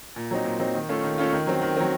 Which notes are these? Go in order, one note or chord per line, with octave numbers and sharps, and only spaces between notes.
A#2
F#3 C4 D#4
A#2
F#3 C4 D#4
D#3
A3 C#4 F4
D#3
A3 C#4 F4
D#3
F#3 C4
D#3
F#3 C4